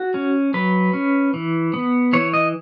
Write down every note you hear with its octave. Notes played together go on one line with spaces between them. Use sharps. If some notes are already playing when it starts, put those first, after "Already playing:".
Already playing: F#4
C#4
F#3 B4
C#4
E3
B3
E3 C#5
D#5